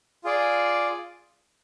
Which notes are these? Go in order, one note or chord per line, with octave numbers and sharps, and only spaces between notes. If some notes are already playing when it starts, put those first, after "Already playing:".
F4 G#4 D5